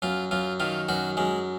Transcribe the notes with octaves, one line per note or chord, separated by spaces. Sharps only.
F#2 F4
F#2 F4
D#3 F4
F#2 F#4
F#2 G#3